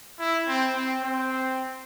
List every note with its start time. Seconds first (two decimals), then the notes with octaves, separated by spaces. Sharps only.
0.19 E4
0.47 C4
0.75 C4
1.03 C4